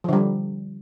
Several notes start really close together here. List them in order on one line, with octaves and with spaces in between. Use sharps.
F3 D3 G3